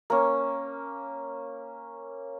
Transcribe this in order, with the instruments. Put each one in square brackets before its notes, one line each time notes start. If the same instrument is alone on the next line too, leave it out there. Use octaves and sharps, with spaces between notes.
[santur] A#3 C#4